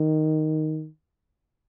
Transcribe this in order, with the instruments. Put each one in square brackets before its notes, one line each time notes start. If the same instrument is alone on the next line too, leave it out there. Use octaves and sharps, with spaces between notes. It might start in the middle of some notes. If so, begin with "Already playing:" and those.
Already playing: [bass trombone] D#3